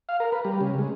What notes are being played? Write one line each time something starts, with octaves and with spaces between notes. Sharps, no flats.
F5
A#4
B4
G3
C#3
G#3